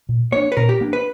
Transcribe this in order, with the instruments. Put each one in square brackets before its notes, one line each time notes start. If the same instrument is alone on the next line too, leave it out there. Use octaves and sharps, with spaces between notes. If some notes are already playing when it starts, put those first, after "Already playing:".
[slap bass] A#2
[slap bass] A#3 D4 [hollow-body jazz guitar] C#5
[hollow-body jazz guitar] B4
[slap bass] A#2 [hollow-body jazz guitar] A#4
[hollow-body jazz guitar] G4
[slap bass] A#3 D4
[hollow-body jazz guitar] B4